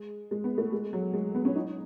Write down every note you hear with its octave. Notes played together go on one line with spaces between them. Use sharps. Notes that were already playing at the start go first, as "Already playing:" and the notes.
Already playing: G#3
G#3
B3
A3
G#3
F#3
G#3
B3
C#4
D#4